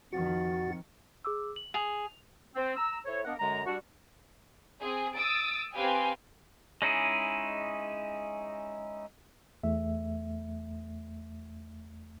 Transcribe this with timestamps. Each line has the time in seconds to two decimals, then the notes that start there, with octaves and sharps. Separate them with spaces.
0.13 F2 D#3 F3 F#4 F#5 A6
1.25 G#4 D6 E6
1.56 F#7
1.74 G#4 F7
2.55 C4
2.77 A#5 E6
3.06 E4 A4 C5 C#5
3.25 A#3 B3 D4 A#4 D#5 F#5
3.39 F#2 D3 G#3 A#5
3.66 G3 D4 F#4
4.80 C4 G#4
5.16 D#6 E6 A6 D7
5.74 C4 G4 B4 F5 G5 G#5
6.82 G#3 C#4 D#4 E4 G#4
9.64 E2 A3 E5